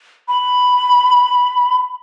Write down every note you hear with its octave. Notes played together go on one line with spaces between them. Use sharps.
B5